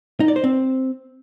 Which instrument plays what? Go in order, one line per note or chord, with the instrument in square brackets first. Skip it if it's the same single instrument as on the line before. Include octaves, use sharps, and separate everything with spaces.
[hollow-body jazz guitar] D#4
D5
C5
C4